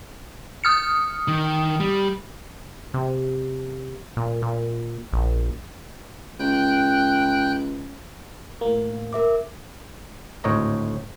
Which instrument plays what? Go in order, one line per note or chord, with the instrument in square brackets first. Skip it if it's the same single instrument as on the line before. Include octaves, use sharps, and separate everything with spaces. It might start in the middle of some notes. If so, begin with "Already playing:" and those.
[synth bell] D#6 F6 C#7
[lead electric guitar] D#3
G3
[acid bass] C3
A#2
A#2
A#1
[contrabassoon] C#2 [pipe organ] G5 F#6 G6
[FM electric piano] A2 A#3
[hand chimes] A#4 E5 D6
[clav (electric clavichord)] G#1 D2 A2 C#5 D#5 A#5